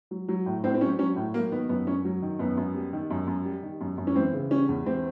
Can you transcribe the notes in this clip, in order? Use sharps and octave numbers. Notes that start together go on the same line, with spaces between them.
F#3
F#3
A2
A2 C4
C4
F#3 C#4
F#3 C#4
A2
F#3 A#3
D#3 B3
F#2 B3
F#2 C#4
F#3
D#3
F#2 B3
F#2
G3
D#3
F#2
F#2
G3
D#3
F#2
F#2
C#4
E3 C4
C#3
G3 C#4
E2
E3 C4